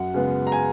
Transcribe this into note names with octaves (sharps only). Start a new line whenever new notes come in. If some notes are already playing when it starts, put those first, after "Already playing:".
Already playing: F#2 F#5
C#3 G#3 B3
A#5
G#5